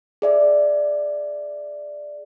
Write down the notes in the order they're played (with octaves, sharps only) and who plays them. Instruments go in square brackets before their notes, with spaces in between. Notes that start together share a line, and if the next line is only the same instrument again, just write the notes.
[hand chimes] G#4 D5 E5